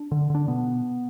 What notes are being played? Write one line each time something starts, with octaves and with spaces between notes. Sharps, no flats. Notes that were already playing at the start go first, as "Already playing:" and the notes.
Already playing: D4
D3
D3 D4
B2 B3